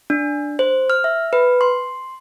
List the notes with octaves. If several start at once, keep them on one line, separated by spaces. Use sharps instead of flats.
D4
C5
F6
E5
B4
C6